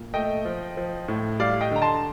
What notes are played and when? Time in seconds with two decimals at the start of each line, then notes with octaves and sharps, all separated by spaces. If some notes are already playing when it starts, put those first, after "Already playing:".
Already playing: A#2
0.14 A3 D#5 G5
0.45 F3
0.77 F3
1.08 A2
1.39 G3 D5 F5
1.61 D#5 G5
1.71 D3 A#5
1.82 A5 C6